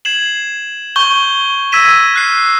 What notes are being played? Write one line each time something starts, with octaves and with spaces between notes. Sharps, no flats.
G#6 C7 E7 F#7
C#6 G6 G7
E6 G#6 A#6 B6 D#7 E7
F6 F#6 C7